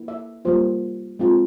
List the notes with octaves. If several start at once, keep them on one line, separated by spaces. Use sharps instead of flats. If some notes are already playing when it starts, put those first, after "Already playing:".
Already playing: A#3 E4
E5
G3 A#3 F4 C5
G#3 C4 F4